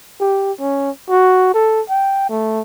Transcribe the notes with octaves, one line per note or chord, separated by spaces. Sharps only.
G4
C#4
F#4
A4
G5
A3